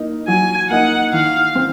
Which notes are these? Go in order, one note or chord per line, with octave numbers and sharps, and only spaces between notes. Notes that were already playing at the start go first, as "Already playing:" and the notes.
Already playing: A#3 D#4
F#3 G#5
A#3 D#4 F#5
D#3 F5
C4